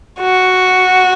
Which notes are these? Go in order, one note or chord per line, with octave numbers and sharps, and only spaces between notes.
F#4